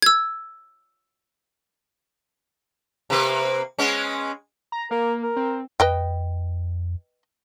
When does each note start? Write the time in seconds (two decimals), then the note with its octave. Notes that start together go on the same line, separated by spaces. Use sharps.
0.02 E6 G#6
3.10 C3 A#3 B4
3.78 G#3 B3 C#4
4.72 A#5
4.91 A#3 A#4
5.23 A#4
5.36 C4
5.80 F2 B4 D#5 G5